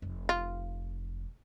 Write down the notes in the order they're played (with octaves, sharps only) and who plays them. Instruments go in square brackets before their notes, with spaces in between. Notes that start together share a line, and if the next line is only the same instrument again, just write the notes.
[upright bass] F1
[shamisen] F4